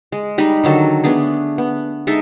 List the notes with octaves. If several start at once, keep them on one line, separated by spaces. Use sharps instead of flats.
G#3
G3 G#3 D#4 B5
D3 D#3 F#3 A4
A3 B3 D4 G#4
B3
G#3 D#4 A4 E5